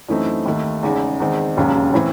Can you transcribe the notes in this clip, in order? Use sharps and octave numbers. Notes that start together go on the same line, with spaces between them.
F#2 E3 A3 C4 D#4
D#2 D#3 A3
E2 C#3 G#3 D#4
E2 D#3 G#3 C4 D#4
E1 D#2 C#3 F#3 C#4
A2 E3 C4